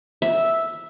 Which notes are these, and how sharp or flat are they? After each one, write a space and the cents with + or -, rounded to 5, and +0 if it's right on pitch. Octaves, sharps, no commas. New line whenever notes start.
E5 -5